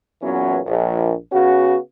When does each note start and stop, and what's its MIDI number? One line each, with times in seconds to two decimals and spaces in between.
0.22 0.59 40
0.22 0.59 46
0.22 0.59 52
0.22 0.59 54
0.22 0.59 59
0.22 0.59 61
0.66 1.12 34
1.32 1.76 49
1.32 1.76 59
1.32 1.76 61
1.32 1.76 66